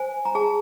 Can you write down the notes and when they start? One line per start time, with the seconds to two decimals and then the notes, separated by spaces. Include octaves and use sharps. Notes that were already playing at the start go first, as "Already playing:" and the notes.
Already playing: C5 G#5
0.25 A#5
0.35 G#4 A5